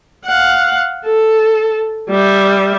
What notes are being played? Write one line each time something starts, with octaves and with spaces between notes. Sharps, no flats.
F5 F#5
A4
G3 E5